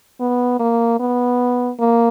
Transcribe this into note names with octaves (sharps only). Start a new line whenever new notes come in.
B3
A#3
B3
A#3